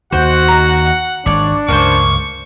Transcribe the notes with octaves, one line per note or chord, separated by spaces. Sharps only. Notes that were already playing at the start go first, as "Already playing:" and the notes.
D#2 D#3 F#4 C5 F#5
A#5
G#1 G#3 D4 C#5 D5
C#2 G2 A#3 C#4 C5 C#6